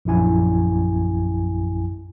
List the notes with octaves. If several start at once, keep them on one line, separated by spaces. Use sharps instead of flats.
A#1 F#2 E4 G#5